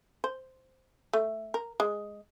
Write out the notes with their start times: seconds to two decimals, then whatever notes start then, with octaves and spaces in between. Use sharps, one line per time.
0.24 C5
1.13 A3
1.54 A#4
1.80 G#3